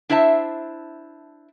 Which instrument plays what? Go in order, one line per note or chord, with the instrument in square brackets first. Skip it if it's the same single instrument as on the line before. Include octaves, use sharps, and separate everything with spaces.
[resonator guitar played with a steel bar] D4 E4 C5 E5 A5